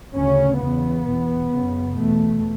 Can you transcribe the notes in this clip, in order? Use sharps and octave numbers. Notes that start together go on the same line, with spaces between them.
D2 C#3 C#4
E2 C#3 B3
E2 B2
F#2 C#3
E2 B2 A3